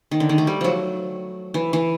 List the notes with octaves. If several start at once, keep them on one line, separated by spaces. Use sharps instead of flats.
D#3
D3
D#3
A3
G3
F3 F#3
E3
E3